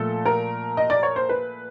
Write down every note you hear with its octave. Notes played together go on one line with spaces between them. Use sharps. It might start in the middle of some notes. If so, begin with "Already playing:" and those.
Already playing: A#2 F3 A3 A4
A#4
D#5
D5
C#5
C5
B4